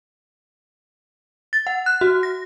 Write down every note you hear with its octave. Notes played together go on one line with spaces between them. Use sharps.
A6
F#5
F#6
F#4
A#6